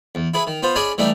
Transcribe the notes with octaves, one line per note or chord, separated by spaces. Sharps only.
E2
E4 G#4 B4
D#3
B3 F4 C5
C#4 G#4 D5 D#5 G#5 B5
E3 G3 A3 D4 D#4